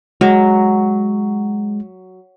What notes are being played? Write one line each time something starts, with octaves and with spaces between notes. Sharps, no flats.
F#3 G#3